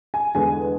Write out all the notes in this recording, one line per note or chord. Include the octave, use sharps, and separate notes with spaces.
G#5
E2 D3 G#3 B3 G#5